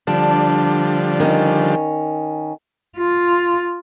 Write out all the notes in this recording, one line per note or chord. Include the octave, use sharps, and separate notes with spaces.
D3 F3 G3 D4
D#3 C#4
F4